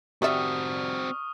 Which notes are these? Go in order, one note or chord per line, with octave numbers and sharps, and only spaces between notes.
G3 C4 F#4 D5 E5 C#6 D#6 F6